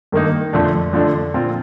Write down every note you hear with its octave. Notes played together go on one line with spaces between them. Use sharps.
G2 D#3 A#3 D#4
F2 D3 F3 A3 D4
F2 D3 F3 A3 D4
A#2 F3 C4 F4